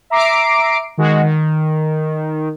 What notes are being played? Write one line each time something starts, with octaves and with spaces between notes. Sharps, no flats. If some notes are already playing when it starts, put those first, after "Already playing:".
E5 A#5 D6 C7 D7
D#3 G#3 F#4
D#3